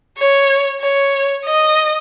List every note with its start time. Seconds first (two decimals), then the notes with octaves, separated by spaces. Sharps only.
0.18 C#5
0.81 C#5
1.45 D#5